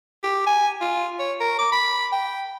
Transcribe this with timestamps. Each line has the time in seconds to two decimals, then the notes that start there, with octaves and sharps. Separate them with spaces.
0.23 G4
0.46 G#5
0.81 F4
1.19 C#5
1.40 A#4
1.59 D6
1.72 B5
2.12 G5